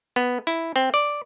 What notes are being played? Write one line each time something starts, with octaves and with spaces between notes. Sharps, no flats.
B3
E4
C4
D5